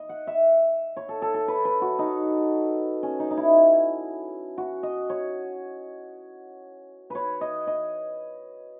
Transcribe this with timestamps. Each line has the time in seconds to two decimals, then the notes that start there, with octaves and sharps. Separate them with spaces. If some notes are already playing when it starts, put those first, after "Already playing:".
Already playing: D#5
0.09 F#5
0.27 E5
0.97 C#5
1.09 A4
1.22 A4
1.34 A4
1.48 B4
1.65 B4
1.81 F#4
1.99 D#4
3.03 C#4
3.19 D#4
3.30 D#4
3.37 E4
4.58 F#4
4.83 D#5
5.10 C#5
7.10 B4 C#5
7.41 D#5
7.67 D#5